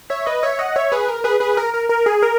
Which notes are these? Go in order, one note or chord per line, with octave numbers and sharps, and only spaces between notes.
C#5 E5
B4 D#5
C#5 E5
D#5 F#5
C#5 E5
G#4 B4
A#4
G#4 B4
G#4 B4
A#4
A#4
A#4
G#4
A#4